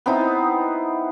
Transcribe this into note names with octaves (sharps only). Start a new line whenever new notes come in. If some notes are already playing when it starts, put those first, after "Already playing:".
B3 C4 D#4 E4